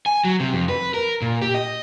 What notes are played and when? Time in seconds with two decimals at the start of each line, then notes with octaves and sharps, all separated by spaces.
0.06 G#5
0.25 F#3
0.40 C3
0.53 F2
0.69 B4
0.94 A#4
1.22 A#2
1.42 G4
1.54 D#5